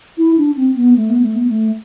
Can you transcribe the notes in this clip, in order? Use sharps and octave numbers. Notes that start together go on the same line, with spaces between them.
E4
D4
C4
B3
A3
B3
A3
B3
A3